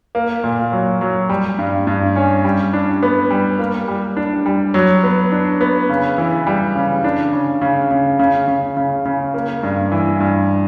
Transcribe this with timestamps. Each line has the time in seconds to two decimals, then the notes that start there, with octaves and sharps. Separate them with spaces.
0.15 A#3
0.44 A#2
0.72 F#3
1.01 F#3
1.29 G3
1.59 G2
1.87 G2
2.16 C#4
2.44 G3
2.73 D4
3.03 B3
3.31 G3
3.59 A#3
3.88 G3
4.17 D4
4.46 G3
4.74 F#3
5.03 B3
5.32 D4
5.61 B3
5.89 C#3
6.18 E3
6.47 G3
6.75 C#3
7.04 D4
7.33 C#3
7.61 C#3
7.91 C#3
8.19 C#3
8.48 C#3
8.77 C#3
9.05 C#3
9.34 A#3
9.63 G2
9.92 E3
10.20 G2